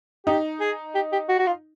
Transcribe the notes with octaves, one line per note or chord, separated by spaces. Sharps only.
D#4 G4
G#4
G4
G4
F#4
F#4
F4